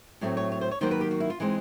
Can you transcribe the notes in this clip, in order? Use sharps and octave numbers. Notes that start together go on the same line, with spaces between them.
A2 F#3 A3 C4
C#5
C#5
C5
C#5
D#3 F#3 A#3 C5
B4
G4
F#4
E4
F4
E3 G#3 C4 D#4